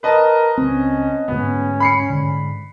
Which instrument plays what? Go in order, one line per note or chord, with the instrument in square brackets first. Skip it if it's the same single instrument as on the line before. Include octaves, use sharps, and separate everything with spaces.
[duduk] A#4 [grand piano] B4 D#5 A5
[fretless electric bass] C#2 C4 [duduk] C#4
[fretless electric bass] D2 G#2 [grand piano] B3 [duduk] C#4
[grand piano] B5 C7 C#7
[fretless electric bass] G#2 D3